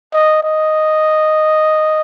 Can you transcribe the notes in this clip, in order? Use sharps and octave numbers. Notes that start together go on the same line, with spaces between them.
D#5
D#5